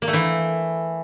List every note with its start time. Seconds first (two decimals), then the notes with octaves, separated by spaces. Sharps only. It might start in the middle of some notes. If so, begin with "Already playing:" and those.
0.02 A#3
0.08 A3
0.13 E3